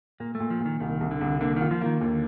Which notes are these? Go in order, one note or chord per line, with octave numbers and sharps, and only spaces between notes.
A#2 A#3
A3
A#2
F3
A#2
D#3
C2 D#3
C2
D3
C2
D3 A#3
D#3 F4
F3
D#3 A#3
D#2 D3